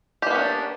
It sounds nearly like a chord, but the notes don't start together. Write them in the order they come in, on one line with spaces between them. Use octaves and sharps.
G4 A#3 B3 C#4 D4